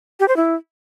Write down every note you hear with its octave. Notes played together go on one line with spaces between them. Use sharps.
G4
C5
E4